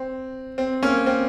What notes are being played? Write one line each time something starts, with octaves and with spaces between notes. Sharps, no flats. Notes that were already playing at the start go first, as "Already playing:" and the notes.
Already playing: C4
C4
A#3 C#4
C4